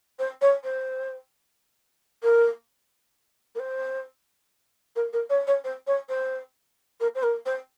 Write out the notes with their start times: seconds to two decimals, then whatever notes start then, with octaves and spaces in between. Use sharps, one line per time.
0.19 C5
0.41 C#5
0.64 C5
2.23 A#4
3.55 A#4
3.59 C5
4.95 A#4
5.13 A#4
5.29 C#5
5.47 C#5
5.64 C5
5.87 C#5
6.09 C5
7.00 A#4
7.15 C5
7.23 A#4
7.45 C5